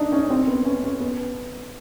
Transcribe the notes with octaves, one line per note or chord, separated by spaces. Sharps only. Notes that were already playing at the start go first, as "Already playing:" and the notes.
Already playing: D4 D#4
C#4
C4
B3
C#4
C#4
B3